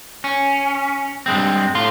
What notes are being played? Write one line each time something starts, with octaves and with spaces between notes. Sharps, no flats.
C#4
G2 G#3 C4
A2 F5 C6